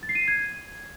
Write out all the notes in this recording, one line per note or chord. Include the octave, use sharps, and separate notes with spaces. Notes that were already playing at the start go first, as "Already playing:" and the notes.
A6
C7
D#7
C7
G#6